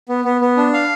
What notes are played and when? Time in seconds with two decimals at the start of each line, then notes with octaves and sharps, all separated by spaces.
0.09 B3
0.25 B3
0.41 B3
0.57 D4
0.73 F5